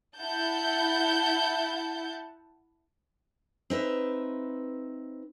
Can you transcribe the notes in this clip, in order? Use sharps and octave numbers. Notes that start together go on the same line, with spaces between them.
E4 F#5 A5 G6
C4 D#4 B4 E5